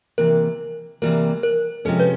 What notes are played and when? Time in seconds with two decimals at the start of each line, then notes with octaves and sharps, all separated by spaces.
0.18 C3 E3 G3 A#3 A#4
1.02 C3 E3 G3 A#3 A#4
1.43 A#4
1.85 C3 F3 G#3 C#4 A4
1.99 B4